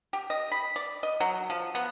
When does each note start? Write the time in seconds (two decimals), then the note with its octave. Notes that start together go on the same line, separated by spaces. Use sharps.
0.13 G4
0.30 D#5
0.52 B5
0.76 D5
1.03 D#5
1.20 F#3
1.50 F3
1.75 B3